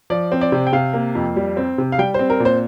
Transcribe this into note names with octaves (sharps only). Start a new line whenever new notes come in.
F3 D5
C4
D5
C3
G5
C3 F5
A#3
F2
G3
C4
C3
F5
G3 G5
C4 C5
A#4
A#2
C5